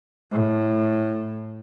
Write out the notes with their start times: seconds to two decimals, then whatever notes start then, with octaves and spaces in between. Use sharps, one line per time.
0.32 A2